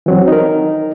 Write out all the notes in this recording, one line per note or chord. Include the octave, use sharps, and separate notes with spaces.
E3 F#3 C4
D#4 A#4